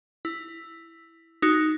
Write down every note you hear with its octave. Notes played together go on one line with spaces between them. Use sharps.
E4
D#4 F#4